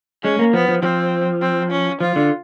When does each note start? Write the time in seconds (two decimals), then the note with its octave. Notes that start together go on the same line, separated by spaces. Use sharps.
0.23 G#3 C#4
0.39 A#3
0.53 F3 B3
0.68 F3
0.83 F3 C4
1.42 C4
1.71 C#4
2.01 F3 F4
2.16 D3